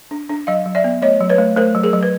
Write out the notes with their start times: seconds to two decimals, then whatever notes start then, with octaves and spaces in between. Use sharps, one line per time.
0.11 D4
0.30 D4
0.47 F#3 D#5 F5
0.66 F#3
0.75 D5 E5
0.84 B3
1.02 A3 C#5 D#5
1.20 F#3
1.30 B4 C#5
1.38 A3
1.56 A3 A#4 C5
1.75 F#3
1.83 G#4 A#4
1.93 F#3
2.03 B4